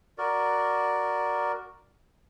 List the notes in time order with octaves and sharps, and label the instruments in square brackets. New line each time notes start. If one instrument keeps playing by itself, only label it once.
[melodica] F#4 A#4 D5